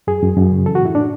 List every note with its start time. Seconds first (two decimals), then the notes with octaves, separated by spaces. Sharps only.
0.07 F#2 G#4
0.23 F#2
0.37 F#2
0.51 C#3
0.66 E3 A4
0.75 F#4
0.81 A2 E4
0.95 A2 D4